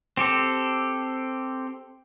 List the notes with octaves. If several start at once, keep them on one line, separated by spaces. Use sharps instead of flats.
C4 G4 A4